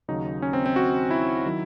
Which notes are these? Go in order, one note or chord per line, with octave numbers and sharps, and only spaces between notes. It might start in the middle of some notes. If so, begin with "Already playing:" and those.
D#2 C#3 F#3 D#4
C#4
C4
C4
F#4
E4
D#3 F#3